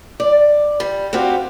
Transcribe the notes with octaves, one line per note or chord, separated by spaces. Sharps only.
D5
G3
C4 F#4 G4 F5